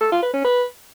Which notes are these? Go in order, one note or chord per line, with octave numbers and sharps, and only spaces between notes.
A4
F4
B4
C#4
B4